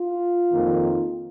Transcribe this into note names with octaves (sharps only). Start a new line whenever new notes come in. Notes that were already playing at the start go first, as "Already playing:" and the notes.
Already playing: F4
F2 D#3 A#3